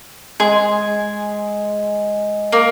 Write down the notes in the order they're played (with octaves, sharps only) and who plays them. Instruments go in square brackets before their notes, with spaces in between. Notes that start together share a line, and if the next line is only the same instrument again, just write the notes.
[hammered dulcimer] G#3 [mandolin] G#4
[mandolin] A#3